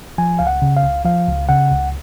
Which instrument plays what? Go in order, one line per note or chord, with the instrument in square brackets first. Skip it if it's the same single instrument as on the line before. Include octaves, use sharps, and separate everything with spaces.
[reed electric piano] F3 G#5
C#2 F5
F#5
C#3
F5
C#2
F3 F5
C#2
C#3 F#5
C#2